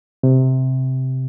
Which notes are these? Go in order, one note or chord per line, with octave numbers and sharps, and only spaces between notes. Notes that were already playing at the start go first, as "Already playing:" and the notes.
C3